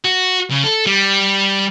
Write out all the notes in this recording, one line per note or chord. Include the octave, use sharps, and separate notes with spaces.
F#4
C#3
A4
G3